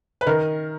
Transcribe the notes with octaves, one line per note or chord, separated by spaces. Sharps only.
B4
D#3 A#4